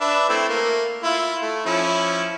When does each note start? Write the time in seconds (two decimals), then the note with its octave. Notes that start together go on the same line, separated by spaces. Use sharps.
0.01 D4 B4 E5
0.29 A3 C4 E4
0.49 A3 A#3
1.03 E4 F4
1.42 A3
1.66 F3 C#4 E4